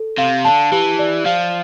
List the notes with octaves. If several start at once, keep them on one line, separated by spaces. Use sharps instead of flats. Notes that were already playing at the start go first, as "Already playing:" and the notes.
Already playing: A4
C3 F5
D3 A5
E3 G4
D5
F3 F5